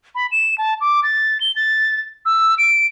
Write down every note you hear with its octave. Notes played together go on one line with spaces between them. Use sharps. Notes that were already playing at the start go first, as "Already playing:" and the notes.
B5
E7
A5
D6
A6
G7
A6
E6
D7